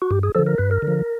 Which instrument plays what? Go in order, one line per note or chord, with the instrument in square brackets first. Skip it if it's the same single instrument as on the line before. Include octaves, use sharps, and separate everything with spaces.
[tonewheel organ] F#4
G2 G4
G#4
D3 F3 A4
A#4
G2 B4
A#4
D3
F3